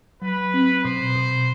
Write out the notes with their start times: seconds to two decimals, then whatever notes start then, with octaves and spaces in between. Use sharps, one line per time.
0.22 F#3 B4
0.54 C4
0.84 B2 C5
1.16 B2